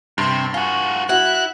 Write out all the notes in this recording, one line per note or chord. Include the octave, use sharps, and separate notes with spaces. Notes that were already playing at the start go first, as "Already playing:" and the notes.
G2 C3
F4 F#4 G#5
E4 F#4 F#6